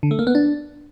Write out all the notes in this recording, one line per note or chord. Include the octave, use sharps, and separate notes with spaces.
D3
A3
A#3
B3
D4